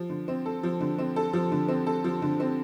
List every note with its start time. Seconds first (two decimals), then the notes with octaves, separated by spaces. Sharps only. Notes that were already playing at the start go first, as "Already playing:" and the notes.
Already playing: F3
0.10 D3
0.28 C4
0.46 A4
0.63 F3
0.81 D3
0.98 C4
1.16 A4
1.33 F3
1.52 D3
1.68 C4
1.87 A4
2.04 F3
2.22 D3
2.40 C4